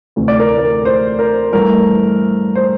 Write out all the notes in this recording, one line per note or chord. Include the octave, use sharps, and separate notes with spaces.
D2 C3 E3 A3
D5
A#4
A#4
C5
A#4
G2 E3 A3 A#4
C5